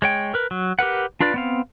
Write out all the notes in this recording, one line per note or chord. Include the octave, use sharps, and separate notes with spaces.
G#3 C#5 G5
A#4 B4
F#3
G4 A#4 B4 F#5
D4 F4 B4 D5
B3 C4 F5